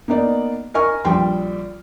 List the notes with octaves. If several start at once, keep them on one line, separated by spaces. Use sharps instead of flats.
A#3 B3 D#4 D5
A#4 D#5 G#5 C#6 F6
A#1 G3 G5 C6